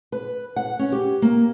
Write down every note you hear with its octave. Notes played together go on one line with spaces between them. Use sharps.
B4
F#5
C#4
G4
A#3